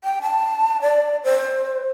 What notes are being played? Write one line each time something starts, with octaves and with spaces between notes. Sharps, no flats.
G5
A5
D5
C5